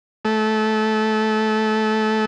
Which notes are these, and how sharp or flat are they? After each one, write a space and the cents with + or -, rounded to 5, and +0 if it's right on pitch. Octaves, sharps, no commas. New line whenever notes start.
A3 -20